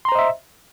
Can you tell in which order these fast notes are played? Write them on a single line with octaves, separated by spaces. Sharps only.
C6 A#5 C5 D#5 E5